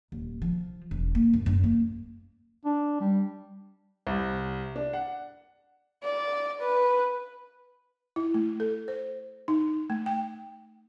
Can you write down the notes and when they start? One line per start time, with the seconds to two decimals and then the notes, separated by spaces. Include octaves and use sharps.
0.12 D#1
0.42 F3
0.91 E1
1.15 A#3
1.34 F#2
1.46 F#2
1.64 A#3
2.65 D4
3.01 G3
4.07 C2
4.76 D4
4.93 F#5
6.03 D5
6.61 B4
8.16 E4
8.34 A3
8.60 A4
8.88 C5
9.48 D#4
9.90 A3
10.06 G5